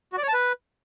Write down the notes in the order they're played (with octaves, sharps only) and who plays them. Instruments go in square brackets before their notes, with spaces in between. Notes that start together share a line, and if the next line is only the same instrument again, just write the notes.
[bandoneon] F#4
D5
C#5
A5
B4